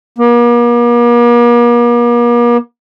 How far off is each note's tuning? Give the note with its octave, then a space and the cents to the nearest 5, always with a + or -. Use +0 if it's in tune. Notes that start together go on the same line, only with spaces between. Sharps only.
A#3 +45